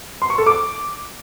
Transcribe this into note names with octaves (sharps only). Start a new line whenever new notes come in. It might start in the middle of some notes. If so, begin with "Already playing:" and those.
C6
C#6
A4
D6